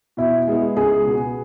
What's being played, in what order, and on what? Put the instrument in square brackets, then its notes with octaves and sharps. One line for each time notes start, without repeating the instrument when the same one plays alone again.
[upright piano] B2 [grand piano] E4
[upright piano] G#3 B3 E4
[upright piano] C#2 [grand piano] G#4
[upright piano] B2 B3